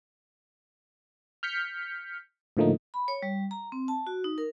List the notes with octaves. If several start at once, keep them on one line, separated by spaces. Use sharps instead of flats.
F6 G6 B6 C#7
A2 D3 F3 A3 A#3 D#4
B5
C#5
G3
A#5
C4
A5
F#4
D#4
A#4